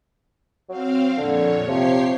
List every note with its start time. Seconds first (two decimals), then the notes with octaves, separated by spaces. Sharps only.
0.69 F#3 C4 F5
1.18 F2 A#2 D3 C#5
1.67 C3 F3 G4 C#5 C7